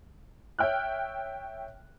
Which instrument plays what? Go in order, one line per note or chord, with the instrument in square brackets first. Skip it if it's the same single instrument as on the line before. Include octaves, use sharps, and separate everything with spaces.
[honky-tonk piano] C#5 E5 G5 F6 F#6